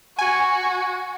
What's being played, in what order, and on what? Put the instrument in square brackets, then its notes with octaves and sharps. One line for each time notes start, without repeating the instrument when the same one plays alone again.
[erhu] F#4 [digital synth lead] G#5